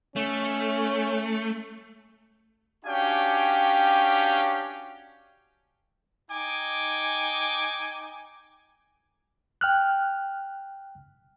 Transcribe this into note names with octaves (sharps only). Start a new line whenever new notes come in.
A3 C#4
C#4 D4 F#4 G4 F5 G5
D#4 G5 G#5 D6
G5 F6 F#6